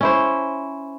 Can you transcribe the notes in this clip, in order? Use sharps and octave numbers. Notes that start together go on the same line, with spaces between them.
C#4 E4 C5